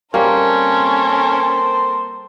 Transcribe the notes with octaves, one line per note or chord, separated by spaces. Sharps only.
G3 A#3 C4 C#4 A4 A#4 C5